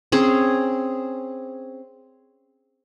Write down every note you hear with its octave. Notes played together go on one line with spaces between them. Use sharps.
C4 C#4 G#4